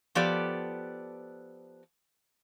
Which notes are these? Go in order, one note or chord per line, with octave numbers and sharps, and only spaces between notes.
F3 B3 G4 A4 D5